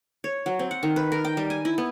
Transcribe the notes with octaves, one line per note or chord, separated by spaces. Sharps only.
C#5
F#3
C4
F#5
D#3
B4
A#4
G5
G3
G#5
E4
B3